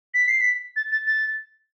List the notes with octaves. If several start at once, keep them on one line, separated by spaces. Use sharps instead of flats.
B6
C7
B6
A6
A6
A6